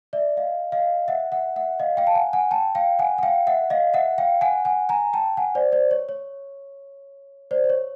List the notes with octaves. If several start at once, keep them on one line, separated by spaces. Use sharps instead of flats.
D5 E5
D#5 F5
D#5 F5
E5 F#5
E5 F#5
E5 F#5
D#5 F5
F5 G5
A5
F#5 G#5
F#5 G#5
G5 A5
F5 G5
F#5 G#5
F#5
F5 G5
E5 F#5
D#5 F5
E5 F#5
F5 G5
F#5 G#5
F#5 G#5
G#5 A#5
G5 A5
F#5 G#5
C5 D5
C5 D5
C#5
C#5
C5 D5
C5
C#5